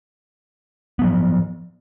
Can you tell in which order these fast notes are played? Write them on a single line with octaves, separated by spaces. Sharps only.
B3 F#3 F3